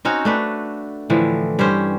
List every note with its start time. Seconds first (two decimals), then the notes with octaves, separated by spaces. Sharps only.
0.05 C4 C#4 D#4 F#4
0.25 A3 D4 B4
1.10 A2 D3 E3 F3
1.59 G2 C#4 G4 C5